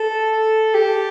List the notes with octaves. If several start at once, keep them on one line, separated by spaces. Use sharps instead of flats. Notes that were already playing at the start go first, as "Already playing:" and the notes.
Already playing: A4
G4